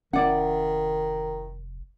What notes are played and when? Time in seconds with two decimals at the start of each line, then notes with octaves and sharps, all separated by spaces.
0.13 F1 D#3 C#4 E4 D5 F#5